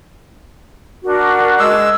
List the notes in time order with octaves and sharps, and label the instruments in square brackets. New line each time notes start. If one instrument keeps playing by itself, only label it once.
[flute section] D4 F#4 A#4
[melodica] G#3 E6